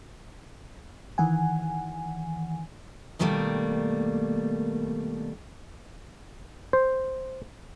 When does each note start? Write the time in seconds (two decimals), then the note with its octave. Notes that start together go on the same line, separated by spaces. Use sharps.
1.18 D#3 E3 F#5 G#5
3.19 B2 D#3 G3 A3 A#3
6.73 C5